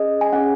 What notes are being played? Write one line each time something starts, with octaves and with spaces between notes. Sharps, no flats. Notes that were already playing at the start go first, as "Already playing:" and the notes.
Already playing: C#4 G#4 D#5
G#5
C#4 G#4 F#5